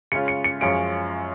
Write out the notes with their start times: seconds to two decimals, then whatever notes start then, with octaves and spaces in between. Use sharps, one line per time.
0.12 C#3 G#3 C#4 F4 C#7
0.28 C#7
0.44 C#7
0.60 F#2 F3 G#3 C#4 F4 D7